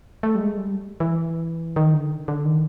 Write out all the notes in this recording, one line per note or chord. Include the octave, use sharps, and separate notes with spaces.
A3
G3
G#3
G3
E3
D#3
D3
D3
D#3